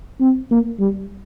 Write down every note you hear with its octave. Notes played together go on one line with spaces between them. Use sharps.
C4
A#3
G3